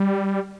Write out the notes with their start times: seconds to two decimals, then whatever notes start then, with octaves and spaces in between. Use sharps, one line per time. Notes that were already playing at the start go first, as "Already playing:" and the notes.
Already playing: G3